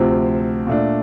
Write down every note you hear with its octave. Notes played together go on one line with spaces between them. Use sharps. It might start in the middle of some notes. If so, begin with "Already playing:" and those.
Already playing: D2 C3 F3 C4
A#2 A3 D4